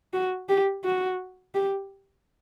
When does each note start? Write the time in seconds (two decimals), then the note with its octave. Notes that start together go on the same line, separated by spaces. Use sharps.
0.13 F#4
0.49 G4
0.84 F#4
1.55 G4